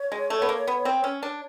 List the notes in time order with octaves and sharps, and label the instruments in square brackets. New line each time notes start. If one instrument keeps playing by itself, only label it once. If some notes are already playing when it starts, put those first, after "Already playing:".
Already playing: [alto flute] C#5
[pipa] G#3
A3
B3
A#3
B3
C4
C#4
D4